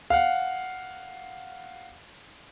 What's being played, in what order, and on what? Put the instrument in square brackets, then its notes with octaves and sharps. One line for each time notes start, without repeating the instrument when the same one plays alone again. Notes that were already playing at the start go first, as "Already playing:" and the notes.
[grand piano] F5 F#5